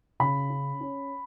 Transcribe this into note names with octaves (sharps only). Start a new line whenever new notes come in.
C#3 B5
C#4
C#4